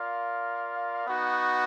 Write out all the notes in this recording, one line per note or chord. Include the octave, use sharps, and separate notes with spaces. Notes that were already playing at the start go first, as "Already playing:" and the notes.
Already playing: F4 A#4 D5 F5
B3 D#4 F#4